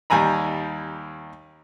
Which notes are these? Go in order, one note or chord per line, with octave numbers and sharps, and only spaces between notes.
D#2 G3 G#5 A#5 B5